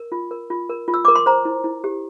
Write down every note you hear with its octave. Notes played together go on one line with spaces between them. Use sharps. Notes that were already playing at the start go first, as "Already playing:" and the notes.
Already playing: A#4
F4
A#4
F4
A#4
F4
E6
A#4 D6
C6
C5 A#5
E4
E4
G4